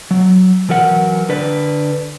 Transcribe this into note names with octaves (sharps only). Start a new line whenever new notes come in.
F#3
E3 F#3 A#4 F#5
D3 B4 D5